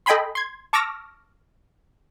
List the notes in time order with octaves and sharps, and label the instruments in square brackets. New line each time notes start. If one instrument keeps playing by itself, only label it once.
[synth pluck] A4 D#5 G5 G#5 B5 C6
C6 G#6
A5 C#6 D6 E6 F6 A#6